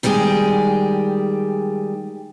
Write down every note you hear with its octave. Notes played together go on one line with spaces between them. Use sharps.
D#3 G3 G#3 G4 G#4